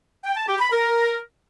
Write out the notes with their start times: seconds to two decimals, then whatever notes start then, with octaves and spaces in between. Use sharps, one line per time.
0.24 G5
0.36 A5
0.48 G4
0.59 B5
0.71 A#4